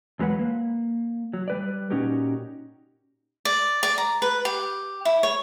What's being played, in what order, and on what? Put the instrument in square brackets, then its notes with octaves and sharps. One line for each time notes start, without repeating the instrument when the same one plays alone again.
[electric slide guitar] E2 F#3 G#3 B4 F#5
A#3
F#3
G3 B4 D5
A#2 C#4 D#4 F#4 G4
[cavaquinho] D5
D5
A#5
B4
G4
E4
C#5